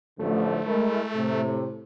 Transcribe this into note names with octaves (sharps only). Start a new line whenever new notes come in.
A1 D3 F3 A3
G#3 E4 A#4
A2 C3